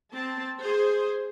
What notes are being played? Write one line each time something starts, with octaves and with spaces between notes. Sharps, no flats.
C4 A5
G#4 C5